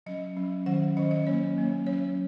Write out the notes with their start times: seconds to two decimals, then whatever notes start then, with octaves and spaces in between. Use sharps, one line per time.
0.06 F#3 C#4 D#5
0.36 F#3 C#4
0.66 D#3 F#3 C#4 F#5
0.97 D#3 F#3 C#4 D#5
1.11 D#5
1.27 F#3 A#3 C#4 C#5
1.57 F#3 A#3 C#4
1.86 F#3 C#4 C#5